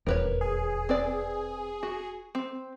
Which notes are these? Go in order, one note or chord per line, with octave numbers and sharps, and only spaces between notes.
D#1 E2 A#4 B4 C#5
G#4
C4 B4 D5
F#4
C4